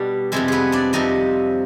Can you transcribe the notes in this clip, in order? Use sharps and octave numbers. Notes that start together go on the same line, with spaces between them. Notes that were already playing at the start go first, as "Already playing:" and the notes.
Already playing: B2 G3 D4 G4
F2 C3 G3 G#3 G#4
B3 G#4 B4
D4 D5
F2 C3 G3 D#4 D#5